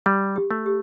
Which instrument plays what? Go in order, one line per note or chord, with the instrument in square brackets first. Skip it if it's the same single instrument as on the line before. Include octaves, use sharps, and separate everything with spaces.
[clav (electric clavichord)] G3 [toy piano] C6
[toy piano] G4
[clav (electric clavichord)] A3
[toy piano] G4